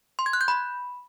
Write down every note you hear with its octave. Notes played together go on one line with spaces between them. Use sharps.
C6
G#6
F#6
G6
B5